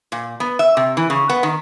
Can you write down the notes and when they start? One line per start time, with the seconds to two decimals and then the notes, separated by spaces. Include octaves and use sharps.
0.12 A#2
0.40 B3
0.59 E5
0.77 C3
0.97 E3
1.10 C#3
1.29 B3
1.43 D#3